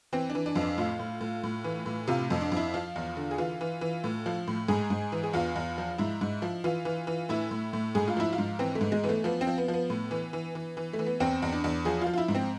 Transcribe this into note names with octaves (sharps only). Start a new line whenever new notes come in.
E3 C4
D4
E3
D4
F2
D4
A2 F4
A2
A2
A2
E3
A2
C3 F4
F2
D4
F2 E4
F3 F4
E2
D3
G#4
E3 F4
E3
E3
A2
F3
A2
G#2 G#4
G#2
E3
G#4
E2 F4
E2
F3
G#2 E4
G#2
F3
E3 F4
E3
E3
A2 E4
A2
A2
G#2 G#4
F4
F3 E4
F4
G#2
E3 C4
A3
G#2
G#3
E3 B3
A3
F3 B3
C4
F3
B3
F3
B3
A2
E3
E3
E3
E3
A3
E3
B3
E2 C4
E2
D4
E2
F3 G#4
F4
F3
F4
E4
G#2
C4